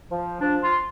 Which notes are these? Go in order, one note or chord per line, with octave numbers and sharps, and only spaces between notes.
F3
F3 D4
F4